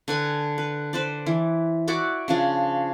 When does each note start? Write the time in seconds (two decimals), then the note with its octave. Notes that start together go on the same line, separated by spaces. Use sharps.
0.08 D3 B4 G#5
0.58 B4
0.93 B4 C5 D5
1.26 E3
1.87 E4 F#4 D5 D6
2.28 C#3 F3 D4